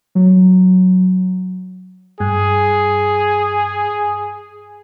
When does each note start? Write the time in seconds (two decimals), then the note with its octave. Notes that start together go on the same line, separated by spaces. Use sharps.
0.15 F#3
2.20 G2 G#4